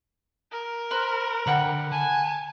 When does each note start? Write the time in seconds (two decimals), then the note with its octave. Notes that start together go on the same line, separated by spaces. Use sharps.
0.51 A#4
0.91 B4 C5
1.47 D3 B4 F#5 G5
1.92 G#5 A5